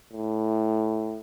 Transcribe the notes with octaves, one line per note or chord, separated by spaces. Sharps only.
A2